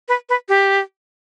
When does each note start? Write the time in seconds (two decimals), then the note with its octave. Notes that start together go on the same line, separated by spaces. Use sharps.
0.09 B4
0.29 B4
0.49 G4